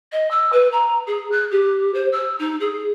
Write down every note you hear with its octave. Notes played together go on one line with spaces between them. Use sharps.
D#5
E6
B4
A#5
G#4
F#6
G4
C5
E6
D#4
G#4